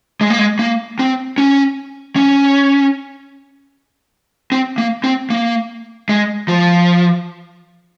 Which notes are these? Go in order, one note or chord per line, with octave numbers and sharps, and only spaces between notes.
G#3
A#3
G#3
A#3
C4
C#4
C#4
C4
A#3
C4
A#3
G#3
F3